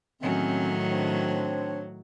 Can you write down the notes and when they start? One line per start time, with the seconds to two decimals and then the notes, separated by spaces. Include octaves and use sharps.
0.22 A2 D#3 F#3 G#3 C4 C#4
0.92 C4 D4 C#5